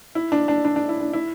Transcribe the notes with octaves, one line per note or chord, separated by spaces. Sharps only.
E4
D4
D4
D4
D4
E4
D4
E4